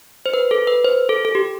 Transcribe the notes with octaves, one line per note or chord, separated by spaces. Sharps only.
C5
B4
A4
B4
C5
A4
A4
G4